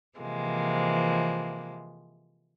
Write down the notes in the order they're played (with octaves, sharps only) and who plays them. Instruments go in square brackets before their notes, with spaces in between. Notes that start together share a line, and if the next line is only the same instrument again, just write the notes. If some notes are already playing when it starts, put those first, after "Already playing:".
[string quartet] C3 E3 F3 G#3 A#3